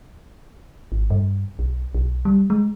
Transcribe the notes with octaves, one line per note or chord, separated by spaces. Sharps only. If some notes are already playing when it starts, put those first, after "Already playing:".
G#1
G2
B1
B1
G3
G#3